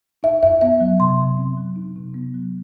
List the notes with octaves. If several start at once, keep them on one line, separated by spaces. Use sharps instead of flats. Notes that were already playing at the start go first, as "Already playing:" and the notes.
D#4 E5
F#2 E5
B3 E5
F#3
C3 C6
C3
C4
F#3
D#4
C3
B3
F#3